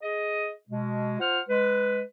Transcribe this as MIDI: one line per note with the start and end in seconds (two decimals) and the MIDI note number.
0.02 0.51 68
0.02 0.51 75
0.69 1.19 47
0.69 1.19 56
1.19 1.40 65
1.19 1.40 72
1.19 1.40 78
1.19 1.40 89
1.49 2.01 56
1.49 2.01 71